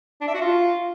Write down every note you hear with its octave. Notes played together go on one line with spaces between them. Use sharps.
D4
E5
F#4
F4